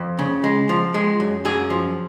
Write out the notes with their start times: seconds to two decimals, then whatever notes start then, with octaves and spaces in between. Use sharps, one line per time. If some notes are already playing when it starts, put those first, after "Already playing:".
Already playing: F2
0.19 C#3
0.44 G#3
0.69 F3
0.94 G#3
1.20 F#2
1.45 F#2 G#4
1.70 F3